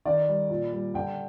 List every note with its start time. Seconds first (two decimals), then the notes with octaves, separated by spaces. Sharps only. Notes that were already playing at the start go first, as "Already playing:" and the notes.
0.05 D#3 D5
0.28 G3
0.50 A#2
0.72 G3
0.94 D3 G5